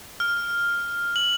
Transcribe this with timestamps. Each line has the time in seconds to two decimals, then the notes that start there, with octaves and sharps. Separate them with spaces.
0.20 F6
1.16 F#7